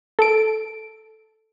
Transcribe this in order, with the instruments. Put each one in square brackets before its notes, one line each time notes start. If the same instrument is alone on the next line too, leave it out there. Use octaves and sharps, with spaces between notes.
[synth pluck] A4 D7